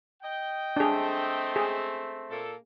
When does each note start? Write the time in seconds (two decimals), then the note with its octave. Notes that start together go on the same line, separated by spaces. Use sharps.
0.23 D#5 G5
0.76 A3 C4 D4 G#4
1.56 G#4
2.30 A#2 A#3 A4